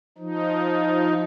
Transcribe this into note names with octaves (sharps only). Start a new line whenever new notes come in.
F3 D#4